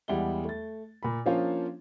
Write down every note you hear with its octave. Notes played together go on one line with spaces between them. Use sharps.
E2 G3 G#3 E4 F#5 G7
A3 A6
A#2 B5
F3 A#3 C#4 D4 F4 C5